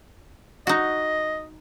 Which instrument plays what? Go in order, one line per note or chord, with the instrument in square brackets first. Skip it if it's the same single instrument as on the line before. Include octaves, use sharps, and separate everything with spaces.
[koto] D#4 F#4 [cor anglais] D#5